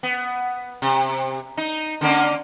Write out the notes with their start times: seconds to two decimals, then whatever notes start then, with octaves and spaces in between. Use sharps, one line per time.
0.03 B3
0.82 C3
1.57 D#4
2.01 D3 A#3 C#4